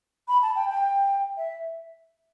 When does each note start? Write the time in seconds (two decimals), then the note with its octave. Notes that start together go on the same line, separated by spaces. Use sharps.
0.28 B5
0.42 A5
0.56 G5
0.70 G5
1.37 E5